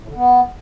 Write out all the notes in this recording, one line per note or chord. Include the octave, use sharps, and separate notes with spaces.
A2
D3
B3